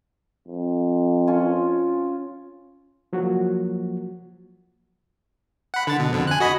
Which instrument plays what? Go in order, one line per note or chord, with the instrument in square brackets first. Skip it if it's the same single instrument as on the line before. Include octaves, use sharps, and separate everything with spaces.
[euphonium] F2
[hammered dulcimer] C#4 F4 G#5
[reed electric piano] F3 F#3 A#3 F#4
[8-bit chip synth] F#5 B5
D3 A6
B2
F2 D3
G#5 F#6
F#4 D#5 B5